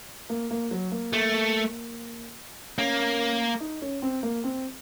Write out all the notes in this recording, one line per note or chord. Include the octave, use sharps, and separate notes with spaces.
A#3
A#3
F#3
A#3
A3
A#3 C#4
D#4
C#4
C4
A#3
C4